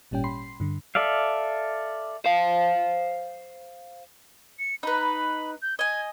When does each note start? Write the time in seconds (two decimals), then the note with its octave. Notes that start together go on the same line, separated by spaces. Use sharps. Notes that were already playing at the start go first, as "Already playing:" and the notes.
0.11 G#1 A#2 G3 C#4 G5
0.24 B5 C6 C7
0.60 G2 D3
0.95 A4 D5 E5 F5
2.24 C5 F5
4.59 C#7
4.83 D#4 B4 B5
5.62 G6
5.79 D#5 G#5 G#6